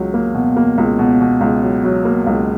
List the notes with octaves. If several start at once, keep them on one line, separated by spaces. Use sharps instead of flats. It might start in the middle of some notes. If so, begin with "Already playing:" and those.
Already playing: C#2 F#3
A#3
B2
A#3
C#2
B2
B2
C#2
F#3
F#3
A#3
C#2